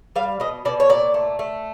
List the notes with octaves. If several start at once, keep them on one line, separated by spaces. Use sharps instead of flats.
G3 F5
B2 D#5
B2 D5
C#5
A#2 D5
A3
A3